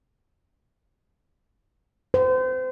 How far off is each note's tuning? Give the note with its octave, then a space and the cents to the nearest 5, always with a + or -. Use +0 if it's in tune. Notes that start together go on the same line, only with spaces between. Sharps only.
C5 -35